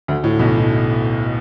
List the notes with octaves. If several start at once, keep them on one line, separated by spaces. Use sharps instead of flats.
D2 D3
A2
B1 B2
A2